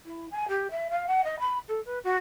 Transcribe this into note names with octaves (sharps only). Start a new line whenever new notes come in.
E4
G#5
G4
E5
F5
F#5
D#5
B5
A4
B4
F#4